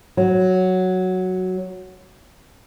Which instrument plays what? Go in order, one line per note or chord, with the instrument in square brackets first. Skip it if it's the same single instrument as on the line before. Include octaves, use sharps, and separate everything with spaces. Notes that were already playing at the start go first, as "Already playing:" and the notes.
[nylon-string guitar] F#3